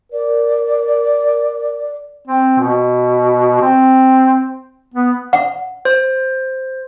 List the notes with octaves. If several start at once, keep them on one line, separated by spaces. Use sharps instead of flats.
A#4 D5
C4
B2
C4
B3
F#5
C5